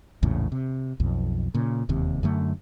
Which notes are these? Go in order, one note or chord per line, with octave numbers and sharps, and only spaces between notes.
A#1 E2 A2 C#3
C3
B1 F2
A#2 C#3
E1 D#2 C3
F#2 D3 A3